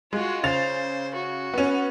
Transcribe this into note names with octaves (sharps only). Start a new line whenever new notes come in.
G#3 F4 F#4
C#3 C5 A6 F7
F#4
B3 C#4